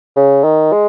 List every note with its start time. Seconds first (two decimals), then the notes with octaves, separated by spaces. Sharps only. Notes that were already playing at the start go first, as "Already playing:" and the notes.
0.16 C#3
0.44 D#3
0.72 G#3